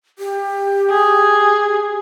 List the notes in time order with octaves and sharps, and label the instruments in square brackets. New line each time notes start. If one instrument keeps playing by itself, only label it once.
[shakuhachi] G4
[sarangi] G#4